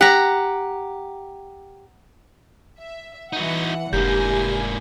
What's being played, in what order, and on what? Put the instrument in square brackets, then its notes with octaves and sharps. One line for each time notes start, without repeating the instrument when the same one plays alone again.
[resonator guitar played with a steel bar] G4 [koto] F#5 A#5
[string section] E5
[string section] E3 F#5 [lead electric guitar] D#4 F#4
[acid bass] F1 [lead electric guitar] G#2 A#3 [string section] D4 E4 G#5 [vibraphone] G4